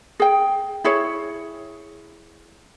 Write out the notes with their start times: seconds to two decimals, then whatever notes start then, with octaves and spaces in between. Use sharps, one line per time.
0.20 G#4 G5
0.84 E4 G#4 C#5